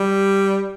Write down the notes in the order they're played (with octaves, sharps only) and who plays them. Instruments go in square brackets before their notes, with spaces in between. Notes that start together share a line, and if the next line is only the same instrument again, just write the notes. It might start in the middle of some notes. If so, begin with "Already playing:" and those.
Already playing: [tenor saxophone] G3